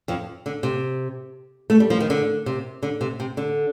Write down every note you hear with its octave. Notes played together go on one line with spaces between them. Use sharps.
F2 F3
D3
C3
A3
G3
F3
D#3
D3
C3
D3
C3
C3
D3